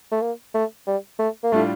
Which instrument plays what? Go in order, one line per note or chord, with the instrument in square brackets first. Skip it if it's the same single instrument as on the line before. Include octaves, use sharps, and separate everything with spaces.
[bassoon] A3
A#3
A3
G3
A3
A#3
[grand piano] A2 G3 D4 F4 [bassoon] A3